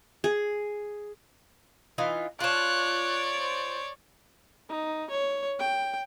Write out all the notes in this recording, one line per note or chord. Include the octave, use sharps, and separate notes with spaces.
G#4
E3 D#4 F4
F4 C#5 D5 A5 F#6
C5
D#4
C#5
G5